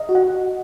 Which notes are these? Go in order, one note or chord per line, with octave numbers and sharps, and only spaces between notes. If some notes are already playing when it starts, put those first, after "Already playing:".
Already playing: D#5
F#4
F#5